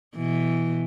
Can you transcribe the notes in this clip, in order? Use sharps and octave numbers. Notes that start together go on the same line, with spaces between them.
B2 E3